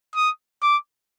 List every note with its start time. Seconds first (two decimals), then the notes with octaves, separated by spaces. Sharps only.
0.16 D#6
0.62 D6